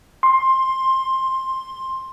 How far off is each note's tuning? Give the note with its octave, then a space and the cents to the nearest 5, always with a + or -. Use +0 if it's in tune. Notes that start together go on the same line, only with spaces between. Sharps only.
C6 +15